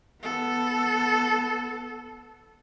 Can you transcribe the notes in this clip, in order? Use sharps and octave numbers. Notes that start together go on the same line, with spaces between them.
B3 A4